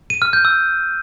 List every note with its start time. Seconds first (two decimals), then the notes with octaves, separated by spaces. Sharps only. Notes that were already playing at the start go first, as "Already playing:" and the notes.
0.10 D#7
0.22 F6
0.33 G6
0.45 E6